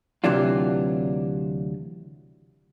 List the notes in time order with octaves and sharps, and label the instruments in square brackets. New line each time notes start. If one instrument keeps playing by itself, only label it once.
[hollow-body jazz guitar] D2 C3 E3 F#3 D4 F4